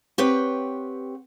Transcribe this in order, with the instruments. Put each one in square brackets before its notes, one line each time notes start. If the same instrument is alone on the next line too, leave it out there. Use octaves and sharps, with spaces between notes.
[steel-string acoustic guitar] C4 G4 B4 C#5 F#5